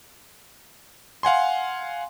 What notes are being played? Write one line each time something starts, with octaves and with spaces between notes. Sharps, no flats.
F5 F#5 G#5 C6